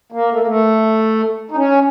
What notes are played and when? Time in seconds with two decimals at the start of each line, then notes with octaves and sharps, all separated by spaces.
0.12 A#3
0.32 A3
0.39 A#3
0.47 A3
1.51 D#4
1.56 C#4